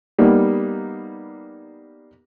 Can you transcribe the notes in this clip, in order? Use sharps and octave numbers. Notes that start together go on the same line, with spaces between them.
G3 A#3 B3 D#4